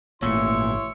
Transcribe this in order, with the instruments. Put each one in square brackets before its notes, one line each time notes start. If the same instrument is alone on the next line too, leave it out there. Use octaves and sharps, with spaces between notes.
[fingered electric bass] G#1 A3 [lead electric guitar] A#2 [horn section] E4 C#5 C6 [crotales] E6 C#7